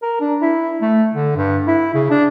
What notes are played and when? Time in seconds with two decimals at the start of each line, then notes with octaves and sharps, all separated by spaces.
0.03 A#4
0.21 D4
0.41 E4
0.82 A3
1.15 D3
1.36 G2
1.67 E4
1.94 C#3
2.10 D4